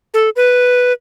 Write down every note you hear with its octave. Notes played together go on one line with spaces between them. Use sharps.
A4
B4